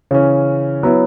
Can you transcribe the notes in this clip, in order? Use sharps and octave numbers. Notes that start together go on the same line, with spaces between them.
C#3 E3 C#4
F#3 B3 E4